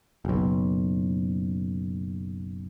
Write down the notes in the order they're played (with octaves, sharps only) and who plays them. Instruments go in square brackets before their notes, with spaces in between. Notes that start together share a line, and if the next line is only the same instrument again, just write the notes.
[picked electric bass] F#1 B1